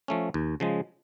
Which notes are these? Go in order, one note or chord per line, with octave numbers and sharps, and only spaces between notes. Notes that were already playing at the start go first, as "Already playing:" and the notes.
F3 A3 C#4
D#2
C#3 F3 G#3